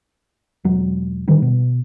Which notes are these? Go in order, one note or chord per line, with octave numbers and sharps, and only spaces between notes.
E1 F#3
D3 D#3 G3
B2